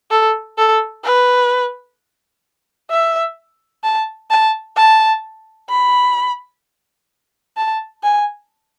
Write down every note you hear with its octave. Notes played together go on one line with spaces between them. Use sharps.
A4
A4
B4
E5
A5
A5
A5
B5
A5
G#5